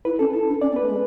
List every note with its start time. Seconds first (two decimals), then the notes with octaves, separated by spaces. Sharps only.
0.05 E4 B4
0.19 C#4 A4
0.33 E4 A4
0.48 D4
0.61 C#4 D5
0.72 B3
0.76 B4
0.81 A3
0.90 G#3